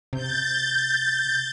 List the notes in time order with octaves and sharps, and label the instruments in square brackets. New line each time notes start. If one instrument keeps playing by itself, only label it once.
[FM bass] C3 [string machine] G6 A6